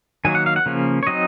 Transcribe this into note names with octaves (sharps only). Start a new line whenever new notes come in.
D#3 F#3 A#3 G#5
F#5
F5
F#5
C#3 F3 A#3 C#4
C#5
F#3 C4 D#4 D#5